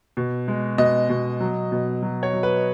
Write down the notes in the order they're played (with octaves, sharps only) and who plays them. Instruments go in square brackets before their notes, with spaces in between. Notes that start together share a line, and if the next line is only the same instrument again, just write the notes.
[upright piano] B2
G#3
B2 D#5
B2
F#3
B2
F#3
C#5
F#3
B4